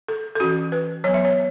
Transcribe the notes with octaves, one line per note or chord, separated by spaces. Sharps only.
A4
A4
E3 C#4 F#4
B4
F#3 B3 C#5
E5
C#5